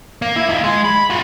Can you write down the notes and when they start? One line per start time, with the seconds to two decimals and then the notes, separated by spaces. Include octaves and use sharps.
0.22 A#3
0.36 E4
0.49 D#4 F4
0.64 G#3
0.85 B5
1.10 F4 F#4